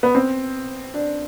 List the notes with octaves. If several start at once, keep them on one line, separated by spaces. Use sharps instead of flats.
B3
C4
D4